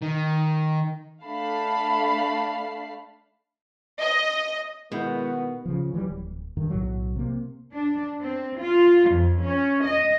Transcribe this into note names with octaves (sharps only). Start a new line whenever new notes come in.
D#3
A3 D4 F5 A5 B5 C7
D#5
B2 D#3 G#3 B3 E4 G6
C#3 F3
E3 F#3 G3
D1
G2 D#3
B1 A2 F#3
C3 A#3
D4
C4
F4
F2
C#4
D#5